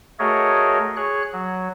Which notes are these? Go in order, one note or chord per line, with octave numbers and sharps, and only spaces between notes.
A3 F#4 G#4 A#4 C#5 D#5
G#4 C#5 F#6
F#3